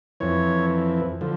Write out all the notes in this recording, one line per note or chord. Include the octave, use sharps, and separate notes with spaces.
F2 E3 C#5
D3 F3